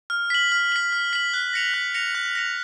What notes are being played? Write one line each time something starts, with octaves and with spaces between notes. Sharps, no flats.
F6
B6 F#7
F6
B6 F#7
F6
B6 F#7
F#6
A#6 C#7 F7
F#6
A#6 C#7 F7
F#6
A#6 C#7 F7